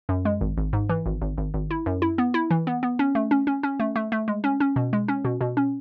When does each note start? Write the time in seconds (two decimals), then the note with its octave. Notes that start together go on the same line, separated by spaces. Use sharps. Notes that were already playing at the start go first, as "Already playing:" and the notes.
0.09 F#2
0.25 G#3
0.41 G#1
0.57 G#1
0.73 G#2
0.89 E3
1.06 G#1
1.22 G#1
1.38 G#1
1.54 G#1
1.71 E4
1.86 F#2
2.02 E4
2.18 B3
2.34 E4
2.51 E3
2.67 B3
2.83 B3
2.99 C#4
3.15 A3
3.31 C#4
3.47 C#4
3.63 C#4
3.80 A3
3.96 A3
4.12 A3
4.28 G#3
4.44 C#4
4.60 C#4
4.76 B2
4.93 G#3
5.08 C#4
5.25 B2
5.41 B2
5.57 C#4